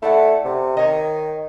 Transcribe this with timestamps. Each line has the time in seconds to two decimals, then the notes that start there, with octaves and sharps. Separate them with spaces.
0.02 A3 E4 D5 F#5
0.45 C3
0.77 D#3 C#5 D#5